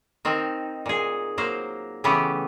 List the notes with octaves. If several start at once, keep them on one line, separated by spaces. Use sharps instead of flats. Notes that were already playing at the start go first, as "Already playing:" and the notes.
D#3 C4 D#4
A#2 G#4
F#3 A#3 C5
C#3 E3 A3 B3 G4